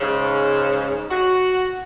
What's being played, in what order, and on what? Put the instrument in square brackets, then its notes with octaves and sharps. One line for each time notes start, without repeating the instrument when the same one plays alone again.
[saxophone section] G#2 C#3
F#4